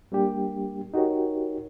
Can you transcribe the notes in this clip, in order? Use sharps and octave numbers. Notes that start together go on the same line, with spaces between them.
G3 A#3 D4 G4
D#4 F#4 G4 A#4 C#5